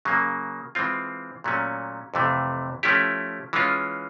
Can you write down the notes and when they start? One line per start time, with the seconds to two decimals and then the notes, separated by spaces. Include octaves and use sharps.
0.05 C#3 F#3 A#3
0.75 E3 G#3 C4 F4
1.44 A#2 F#3 A3 C#4
2.14 F2 C3 E3 A3
2.83 F3 A3 C#4 E4 G4
3.53 E3 G#3 C#4 F4